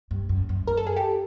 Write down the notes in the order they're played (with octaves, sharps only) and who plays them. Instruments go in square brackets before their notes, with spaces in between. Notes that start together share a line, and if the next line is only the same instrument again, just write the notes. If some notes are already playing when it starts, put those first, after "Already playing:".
[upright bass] G2
F#2
F#2
[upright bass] F#2 [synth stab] A#4
[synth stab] A4
G#4
G4 A4